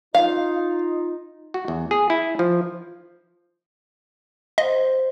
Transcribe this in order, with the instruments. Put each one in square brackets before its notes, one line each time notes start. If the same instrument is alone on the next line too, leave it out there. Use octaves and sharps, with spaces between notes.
[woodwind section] D#4 F4 [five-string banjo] F5
[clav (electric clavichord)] F#4
E2
G#4
E4
F3
[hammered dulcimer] C5 [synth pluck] D#5